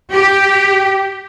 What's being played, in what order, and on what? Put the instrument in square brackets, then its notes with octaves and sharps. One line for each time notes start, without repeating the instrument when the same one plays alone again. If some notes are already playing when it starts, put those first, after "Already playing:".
[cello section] G4